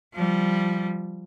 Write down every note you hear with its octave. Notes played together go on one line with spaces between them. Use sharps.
F3 G3